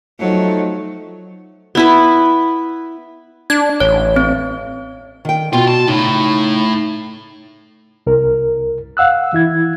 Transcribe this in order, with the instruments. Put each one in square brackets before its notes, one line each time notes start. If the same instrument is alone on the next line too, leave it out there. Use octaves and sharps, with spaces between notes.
[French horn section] F3 A3 D#4 [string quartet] F#3
[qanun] B3 E4 B4
[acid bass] D4 [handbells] G#6
[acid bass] A1 [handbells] C#5
[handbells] C4
[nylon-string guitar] D#3 G5
[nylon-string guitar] B2 G5 [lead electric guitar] F4 [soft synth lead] F#4
[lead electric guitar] A5
[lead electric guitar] A2 [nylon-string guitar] C#3 [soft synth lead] D#4
[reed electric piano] C2 A#4
F5 F#5 E6 F#6
E3 E4 G#6